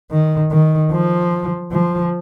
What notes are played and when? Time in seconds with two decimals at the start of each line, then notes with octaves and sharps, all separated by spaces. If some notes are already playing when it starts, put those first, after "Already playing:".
0.11 D#3
0.51 D#3
0.91 F3
1.72 F3